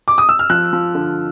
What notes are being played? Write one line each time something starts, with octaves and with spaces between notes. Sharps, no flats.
D6
D#6
E6
F6
F3 F#6
F3
D3